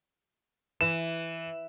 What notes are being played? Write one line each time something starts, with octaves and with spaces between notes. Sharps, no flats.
E3 E7